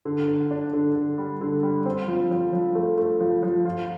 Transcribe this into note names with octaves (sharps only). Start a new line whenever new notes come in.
D3
D3
D4
D3
D3
G3
D3
G3
C4
F3
F3
F3
A3
A3
F3
F3
F4